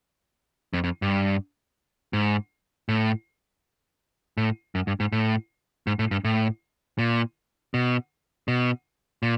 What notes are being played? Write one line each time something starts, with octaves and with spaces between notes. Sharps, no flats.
F2
F2
G2
G#2
A2
A2
F#2
G2
G#2
A2
G#2
A2
G2
A2
A#2
B2
B2
A#2